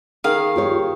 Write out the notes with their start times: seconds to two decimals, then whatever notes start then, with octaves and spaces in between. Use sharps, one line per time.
0.24 D#3 G#4 A#4 F5
0.56 F4 G4 C#5